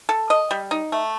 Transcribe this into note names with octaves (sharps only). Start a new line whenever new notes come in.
A4
D#5
G3
D#4
A3